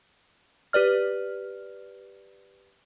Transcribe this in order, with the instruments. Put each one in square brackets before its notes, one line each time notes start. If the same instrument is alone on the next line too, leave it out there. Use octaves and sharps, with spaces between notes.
[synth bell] G4 B4 D5 F6